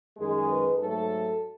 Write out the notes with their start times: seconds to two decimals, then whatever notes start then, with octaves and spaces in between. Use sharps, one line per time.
0.16 F#2 D#3 G#3 G#4
0.47 B4
0.77 G#2 F#3 A3 A4